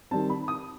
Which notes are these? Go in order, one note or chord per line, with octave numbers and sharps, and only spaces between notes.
D#3 G3 C4 A5
B5
D#6